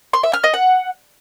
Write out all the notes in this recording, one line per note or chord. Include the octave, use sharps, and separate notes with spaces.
C6
E5
F6
D#5
F#5